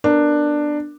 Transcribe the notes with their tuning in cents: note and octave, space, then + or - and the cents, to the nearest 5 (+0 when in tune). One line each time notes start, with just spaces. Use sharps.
B3 +0 D4 +10 A#4 +0